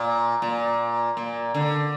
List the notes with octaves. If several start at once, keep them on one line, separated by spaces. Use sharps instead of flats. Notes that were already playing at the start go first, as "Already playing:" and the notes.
Already playing: A#2
A#2
A#2
D3